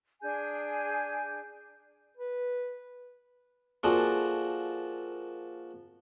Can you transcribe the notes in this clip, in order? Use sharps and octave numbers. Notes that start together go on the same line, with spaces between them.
D4 G#4 G#5 G6
B4
F3 A#3 F#4 G#4 A4 D5